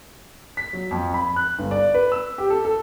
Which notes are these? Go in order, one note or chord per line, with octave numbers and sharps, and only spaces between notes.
B6
F#3
F2
B5
F#6
G1
D5
B4
E6
G4
A4
A4